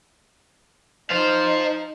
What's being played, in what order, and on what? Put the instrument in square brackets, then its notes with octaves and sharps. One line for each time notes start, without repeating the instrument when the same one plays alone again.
[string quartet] D#4 [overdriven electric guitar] C5 F5